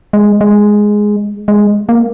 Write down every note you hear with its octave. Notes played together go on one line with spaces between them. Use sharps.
G#3
G#3
G#3
A#3